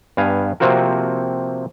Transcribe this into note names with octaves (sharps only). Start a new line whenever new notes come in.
G2 B3 F5 G#5
C3 F3 A#3 C4 F#4 A#4